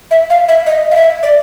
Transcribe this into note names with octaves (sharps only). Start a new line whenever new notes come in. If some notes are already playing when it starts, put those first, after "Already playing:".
E5
F5
E5
D#5
F5
E5
D5